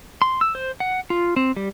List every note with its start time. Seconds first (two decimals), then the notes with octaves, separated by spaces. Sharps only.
0.22 C6
0.41 E6
0.55 C5
0.80 F#5
1.10 F4
1.36 C4
1.57 G3